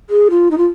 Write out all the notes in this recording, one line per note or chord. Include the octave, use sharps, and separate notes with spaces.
G#4
F4
D#4
F4